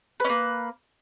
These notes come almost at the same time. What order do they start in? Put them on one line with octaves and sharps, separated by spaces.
B4 C#4 A#3